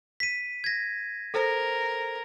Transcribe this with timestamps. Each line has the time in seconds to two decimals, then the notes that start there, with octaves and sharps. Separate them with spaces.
0.20 B6 D#7
0.64 G#6 A#6
1.34 A4 A#4 C5